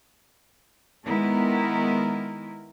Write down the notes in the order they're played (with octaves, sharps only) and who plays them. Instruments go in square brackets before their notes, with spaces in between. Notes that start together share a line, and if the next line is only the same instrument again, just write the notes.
[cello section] D#3 G#3 B3 E4 A#4